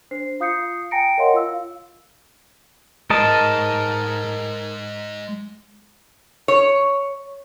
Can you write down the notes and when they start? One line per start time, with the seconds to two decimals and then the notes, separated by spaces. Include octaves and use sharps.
0.11 D4 C5 C7
0.40 F4 F5 D#6 G6 C7 C#7
0.91 G5 G#5 A#5 A#6 C#7 D7
1.18 A#4 C#5 D#5 F5 F#5 C6
1.34 F4 F5 E6
3.10 G#3 A#4 C5 D#5 A5
6.48 C#5